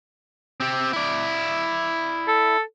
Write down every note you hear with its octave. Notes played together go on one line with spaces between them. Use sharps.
C4 G4
E4 D5
A4